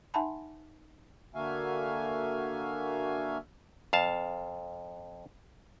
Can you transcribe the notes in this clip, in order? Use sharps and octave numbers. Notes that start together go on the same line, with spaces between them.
D#4 E5 F#5 G#5 A5 B5
D3 A#3 F#4 E5 F5 G#5
F2 F5 A5